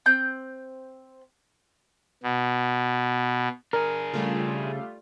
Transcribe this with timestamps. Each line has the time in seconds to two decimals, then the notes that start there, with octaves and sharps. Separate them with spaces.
0.06 C4 G6
2.23 B2
3.73 D4 G#4 A#4
4.13 C#3 G3 A3 F4